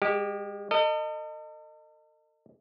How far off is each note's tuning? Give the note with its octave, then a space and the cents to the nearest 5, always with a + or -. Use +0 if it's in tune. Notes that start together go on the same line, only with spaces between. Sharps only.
G#3 -35 G4 +0
A4 +45 D#5 -20